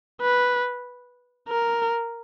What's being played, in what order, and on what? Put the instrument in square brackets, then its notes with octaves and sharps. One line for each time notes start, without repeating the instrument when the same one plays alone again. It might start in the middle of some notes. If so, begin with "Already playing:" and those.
[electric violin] B4
A#4